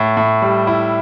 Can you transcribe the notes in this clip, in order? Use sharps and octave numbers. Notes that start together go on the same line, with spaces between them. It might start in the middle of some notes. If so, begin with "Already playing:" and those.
Already playing: A2
A2
G3
E4